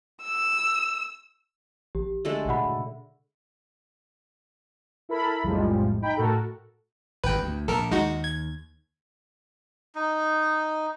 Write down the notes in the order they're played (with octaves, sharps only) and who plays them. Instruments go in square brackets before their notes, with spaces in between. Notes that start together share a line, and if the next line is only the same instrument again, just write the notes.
[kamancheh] E6
[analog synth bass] A#1 [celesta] G4
[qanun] D3 G#3 A3
[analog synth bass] B2 [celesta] F#5 B5
[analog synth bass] B2
[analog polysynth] E4 A4 A#4 B5
B1 F2 A2 F3 G3 G#3
D#4 G5 B5
A2 F#4 A4 A#4
[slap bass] G#1 E2 G2 [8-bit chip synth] B4 G5
[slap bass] D2
[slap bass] A#1 [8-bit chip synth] A4 A#4
[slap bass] D#2 [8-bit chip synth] G#3 D#4 F#4
[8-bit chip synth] G#6
[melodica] D#4